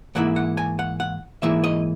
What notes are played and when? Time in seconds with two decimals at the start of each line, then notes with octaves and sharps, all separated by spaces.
0.15 G#2 E3 A#3 E4 F#5
0.36 F#5
0.57 G#5
0.79 F#5
1.00 F#5
1.42 G#2 E3 A#3 E4 E5
1.64 D#5